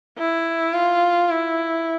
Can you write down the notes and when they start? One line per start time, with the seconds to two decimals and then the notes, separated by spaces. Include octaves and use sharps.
0.18 E4
0.74 F4
1.30 E4